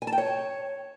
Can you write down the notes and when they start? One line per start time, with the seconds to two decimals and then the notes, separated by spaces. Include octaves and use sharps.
0.02 G#5
0.07 A5
0.12 G5
0.18 C#5